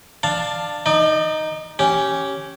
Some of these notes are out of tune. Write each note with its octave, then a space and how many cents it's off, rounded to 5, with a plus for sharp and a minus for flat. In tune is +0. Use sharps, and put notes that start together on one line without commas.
D4 +15 F5 +0 A5 +0
D#4 +0 D5 +40
C#4 +0 G4 -15